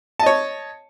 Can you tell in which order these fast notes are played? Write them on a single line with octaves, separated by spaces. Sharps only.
A5 D#5 C#5